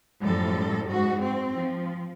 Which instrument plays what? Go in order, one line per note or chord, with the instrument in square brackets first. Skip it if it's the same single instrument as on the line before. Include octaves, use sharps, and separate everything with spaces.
[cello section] F#2 A2 F3 G3 A4
G#2 F#4
C4
F3